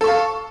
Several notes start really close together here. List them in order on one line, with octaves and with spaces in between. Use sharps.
A4 C#6 F5